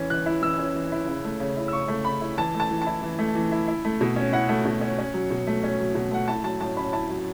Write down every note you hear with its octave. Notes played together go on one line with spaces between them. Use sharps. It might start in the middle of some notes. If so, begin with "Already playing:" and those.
Already playing: E3 C#4
E3 F#6
E4
E3 E6
C#4
E3
E4
C#3
A3
C#3
E4
E6
C#3 C#6
A3
C#3 B5
E4
E3 A5
A3
A5
E3
E4 A5
E3
A3
E3
E4
E4
A3
B2
C#4
E4 F#5
A3
B2
C#4
C#4
F#3
B2
A3
C#4
F#3
B2
A3 F#5
E4 A5
F#3 A5
A2 A5
C#4 B5
E4 A5
F#3